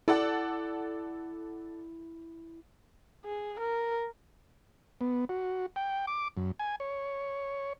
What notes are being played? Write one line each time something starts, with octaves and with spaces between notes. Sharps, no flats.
E4 A4 D5 F#5
G#4
A#4
B3
F#4
G5
D6
F#2
G#5
C#5